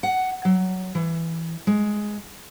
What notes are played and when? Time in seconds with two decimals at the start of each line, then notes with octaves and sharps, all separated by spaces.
0.03 F#5
0.45 F#3
0.95 E3
1.67 G#3